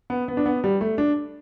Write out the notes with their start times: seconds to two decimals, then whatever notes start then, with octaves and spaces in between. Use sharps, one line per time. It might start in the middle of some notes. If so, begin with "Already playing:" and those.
0.10 B3
0.28 B3
0.37 D4
0.46 B3
0.64 G3
0.81 A3
0.98 D4